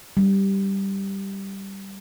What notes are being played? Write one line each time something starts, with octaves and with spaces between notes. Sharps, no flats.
G3